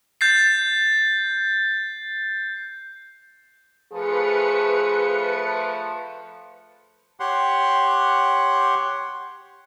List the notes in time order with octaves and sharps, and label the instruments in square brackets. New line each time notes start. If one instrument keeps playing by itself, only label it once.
[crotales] G6 A6 C7
[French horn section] F3 A3 [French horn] G#4 [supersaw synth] B4 C#7
[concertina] G4 C#5 F#5 C6